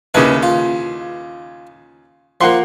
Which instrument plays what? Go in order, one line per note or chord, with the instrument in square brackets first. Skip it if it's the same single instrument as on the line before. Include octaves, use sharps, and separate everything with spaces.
[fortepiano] D#2 C#3 [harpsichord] E4 B4
[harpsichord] F4
[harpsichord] F3 [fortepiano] A#3 F#5 C6